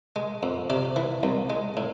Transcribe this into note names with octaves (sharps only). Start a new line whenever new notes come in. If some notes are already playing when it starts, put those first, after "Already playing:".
G#3
F2
C3 D5
E3
C2
G#3
A2